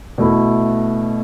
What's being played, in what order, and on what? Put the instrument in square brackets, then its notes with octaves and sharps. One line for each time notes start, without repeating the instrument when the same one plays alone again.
[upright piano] B2 A3 E4